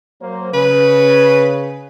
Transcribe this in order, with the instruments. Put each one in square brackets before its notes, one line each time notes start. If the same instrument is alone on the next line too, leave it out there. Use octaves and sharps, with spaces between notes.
[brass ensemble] F#3 A#3 C5
[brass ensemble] C#3 [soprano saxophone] B4